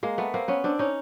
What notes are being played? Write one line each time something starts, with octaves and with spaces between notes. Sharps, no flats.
G#3 A#3
A3 B3
A#3 C4
B3 C#4
C4 D4
C#4 D#4